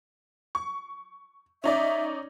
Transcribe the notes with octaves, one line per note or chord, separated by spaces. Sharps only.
C#6
C#4 D#4 D5 E5